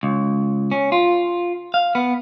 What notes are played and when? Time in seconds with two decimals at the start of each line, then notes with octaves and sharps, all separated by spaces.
0.03 C#2
0.71 C#4
0.92 F4
1.74 F5
1.95 B3